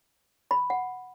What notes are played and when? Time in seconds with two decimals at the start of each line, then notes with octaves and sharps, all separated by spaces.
0.51 B5
0.70 F#5